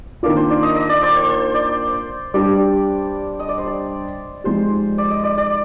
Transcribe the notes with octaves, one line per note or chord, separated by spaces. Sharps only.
D#3 A#3 D4 F4 D5
C5
D5
D#5
D#5
D5
C5
C5
C5
D5
G3 D4 G4 D5
D#5
D5
C5
D5
F3 G#3 D#4 G4 C5
D5
D#5
D5
D5